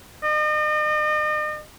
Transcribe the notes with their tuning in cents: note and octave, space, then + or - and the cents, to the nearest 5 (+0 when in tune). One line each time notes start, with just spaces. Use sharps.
D#5 -40